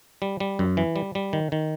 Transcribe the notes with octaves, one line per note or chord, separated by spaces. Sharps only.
G3
G3
F#2
E3
G3
G3
D#3
D#3